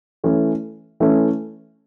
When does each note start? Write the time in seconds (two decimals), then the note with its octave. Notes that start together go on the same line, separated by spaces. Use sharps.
0.24 E3 A3 C#4
1.00 E3 A3 C#4